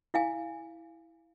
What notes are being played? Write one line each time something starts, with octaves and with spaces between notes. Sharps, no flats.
E4 F5 G#5